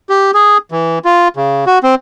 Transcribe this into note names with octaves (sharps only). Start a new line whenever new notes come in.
G4
G#4
E3
F4
C#3
F#4
C4